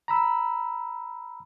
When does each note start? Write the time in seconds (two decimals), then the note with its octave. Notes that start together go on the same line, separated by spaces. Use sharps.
0.08 A#5 B5 E6